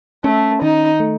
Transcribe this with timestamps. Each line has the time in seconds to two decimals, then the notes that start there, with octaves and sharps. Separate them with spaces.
0.24 A3 C#4
0.62 D#3 D#4
1.00 A3